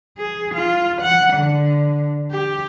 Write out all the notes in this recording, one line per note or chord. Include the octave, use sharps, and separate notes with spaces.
G#4
F4
F#5
D3
G4